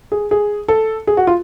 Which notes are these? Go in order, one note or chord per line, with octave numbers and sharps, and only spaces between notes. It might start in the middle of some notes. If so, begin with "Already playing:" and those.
G#4
G#4
A4
G#4
F#4
F4